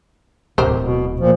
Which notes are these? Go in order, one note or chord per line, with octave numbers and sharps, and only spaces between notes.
D1 G4 A#4 C5
B2
A#2 F3